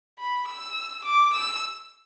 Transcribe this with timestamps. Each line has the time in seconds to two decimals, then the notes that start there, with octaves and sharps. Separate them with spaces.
0.19 B5
0.47 E6
1.04 D6
1.33 E6